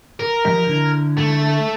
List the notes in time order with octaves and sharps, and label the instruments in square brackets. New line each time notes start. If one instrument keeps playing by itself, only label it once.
[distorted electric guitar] A#4
[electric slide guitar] F3 G4 D#5
D3 E4
[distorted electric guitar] A3